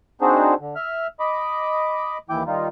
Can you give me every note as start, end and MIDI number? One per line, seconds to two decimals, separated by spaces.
0.21 0.54 60
0.21 0.54 62
0.21 0.54 63
0.21 0.54 66
0.21 0.54 68
0.21 0.54 72
0.60 0.75 50
0.76 1.07 76
0.76 1.07 89
1.20 2.18 75
1.20 2.18 83
1.20 2.18 86
2.30 2.43 39
2.30 2.43 52
2.30 2.43 64
2.30 2.43 79
2.30 2.43 86
2.47 2.68 51
2.47 2.68 55
2.47 2.68 63
2.47 2.68 65